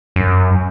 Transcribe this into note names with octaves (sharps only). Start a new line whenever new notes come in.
F#2